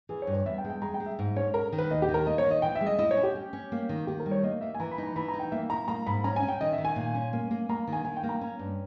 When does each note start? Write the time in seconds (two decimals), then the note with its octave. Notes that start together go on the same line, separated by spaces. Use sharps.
0.09 E3 G#4
0.22 C#5
0.27 G2
0.33 C#5
0.46 E2 E5
0.58 G5
0.64 G#3
0.69 G5
0.82 G#3 A#5
0.94 G5
1.00 G#3
1.06 E5
1.19 G#2
1.36 C#4 C#5
1.54 G#3 A#4
1.72 D#3
1.78 B4
1.90 D#2 D#5
2.02 G4
2.09 D#3
2.14 A#4
2.27 A#3 D#5
2.38 C#5
2.44 D#3
2.51 D#5
2.62 E3 G5
2.75 E5
2.81 G#3
2.87 D#5
2.99 E4 D#5
3.11 C#5
3.17 C#4
3.23 G4
3.35 C#4
3.53 C#4
3.72 A#3
3.89 D#3
4.07 D#3 G4
4.20 A#4
4.26 G3
4.31 C#5
4.43 A#3 D#5
4.61 A#3 E5
4.75 G#5
4.80 E3 A#5
4.91 B5
4.98 D#4
5.03 A#5
5.16 E3 B5
5.28 A#5
5.34 D#4
5.40 G5
5.52 A#3 E5
5.70 E4 A#5
5.88 A#3 A#5
6.06 G#2 B5
6.24 C#4 A#5
6.36 G#5
6.42 C#4
6.49 G5
6.61 D#3 D#5
6.73 E5
6.78 D#3
6.85 G#5
6.96 A#2
7.15 C#4
7.33 A#3
7.51 A#3
7.69 A#3 A#5
7.87 D#3
7.93 G#5
8.05 D#3 G#5
8.17 G5
8.23 A#3
8.29 A#5
8.41 C#4
8.59 G2